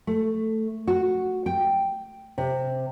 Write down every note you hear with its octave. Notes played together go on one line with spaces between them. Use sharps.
A3
F#4
G5
C3